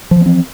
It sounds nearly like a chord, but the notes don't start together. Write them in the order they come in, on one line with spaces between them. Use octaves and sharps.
F3 E3 B3 C4